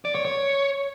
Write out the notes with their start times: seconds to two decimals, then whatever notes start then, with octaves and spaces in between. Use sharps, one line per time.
0.05 D5
0.15 C#5
0.25 C#5